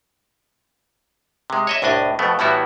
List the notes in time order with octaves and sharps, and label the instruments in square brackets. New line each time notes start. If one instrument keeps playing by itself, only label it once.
[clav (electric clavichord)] C3 G#3
C#5 D#5 E5
C2 A2 D4 D#5 G#5
F2 B2 A3 B3
A2 E3 G3 B3 E4 F#4